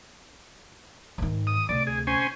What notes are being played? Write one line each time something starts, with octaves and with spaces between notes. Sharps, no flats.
G#2 D#3
D#6
D2 C3 D5
G#4
C#4 C5 G#5